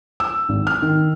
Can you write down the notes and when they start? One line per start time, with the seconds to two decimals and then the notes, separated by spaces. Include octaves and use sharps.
0.20 E6
0.49 G#1
0.67 F6
0.82 D#3